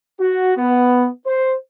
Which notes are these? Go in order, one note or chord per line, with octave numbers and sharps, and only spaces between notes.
F#4
B3
C5